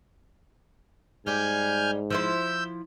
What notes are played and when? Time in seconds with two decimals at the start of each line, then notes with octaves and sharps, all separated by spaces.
1.26 G#2 G3 G4 G#5 F6 G6
2.10 F3 E4 C5 E6 G6